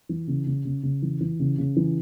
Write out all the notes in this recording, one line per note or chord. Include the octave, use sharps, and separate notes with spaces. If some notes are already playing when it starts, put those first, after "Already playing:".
E3
C#3
C#3
C#3
C#3
E3
E3
C#3
C#3
E3